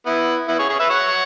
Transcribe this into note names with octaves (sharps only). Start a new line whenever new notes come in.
B3 E4
B3 E4
G#4 C#5
G#4 C#5
B4 E5
C#5 F#5